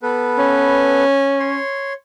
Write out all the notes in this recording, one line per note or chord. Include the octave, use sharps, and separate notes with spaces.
B3 A4 B4
C#4
C#5 C6